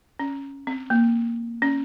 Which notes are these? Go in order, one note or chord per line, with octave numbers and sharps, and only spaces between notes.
C#4
C4
A#3
C#4